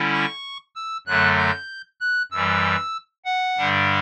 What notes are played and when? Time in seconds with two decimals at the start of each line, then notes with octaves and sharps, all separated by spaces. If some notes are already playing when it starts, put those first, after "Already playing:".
Already playing: D3 G3 C#4 E4
0.13 C#6
0.76 E6
1.07 F#2 D3 F#3 A3 F#6
1.38 G6
2.01 F#6
2.32 F#2 E3 G3 E6
3.25 F#5
3.57 G2 D3 G3 D4